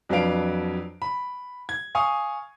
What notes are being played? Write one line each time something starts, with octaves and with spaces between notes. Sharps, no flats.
F2 F#3 D4 B4 F5 D7
B5
G#6
F5 G#5 C#6 D#6